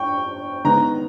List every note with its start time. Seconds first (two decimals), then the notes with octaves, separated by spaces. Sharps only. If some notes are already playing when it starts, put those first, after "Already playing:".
Already playing: G5 C#6
0.64 D#3 G#3 B3 A#5